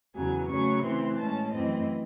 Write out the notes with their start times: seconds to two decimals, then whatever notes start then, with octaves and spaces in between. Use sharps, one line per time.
0.15 E2 C#3 F#3 G#5
0.49 C#3 F#3 A3 C#4 C#6
0.83 C#3 E3 A3 C4 C6
1.18 A2 G#3 C#4 A5
1.51 F#2 E3 A3 C4 D#5